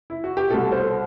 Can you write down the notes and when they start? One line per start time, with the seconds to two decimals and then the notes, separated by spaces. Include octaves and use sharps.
0.10 E4
0.24 F#4
0.37 G4
0.49 C2 B2 F#4 A4
0.72 A4 C5